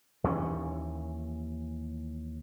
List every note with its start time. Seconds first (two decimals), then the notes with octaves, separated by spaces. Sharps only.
0.24 D#2 E3 C#4